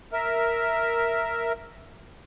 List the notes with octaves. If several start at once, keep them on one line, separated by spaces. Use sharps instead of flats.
A#4 E5